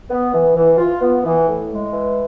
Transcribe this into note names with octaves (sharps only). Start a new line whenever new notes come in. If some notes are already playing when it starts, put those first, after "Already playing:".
B3
E3
E3
F4
B3
E3
A2
G#3
E3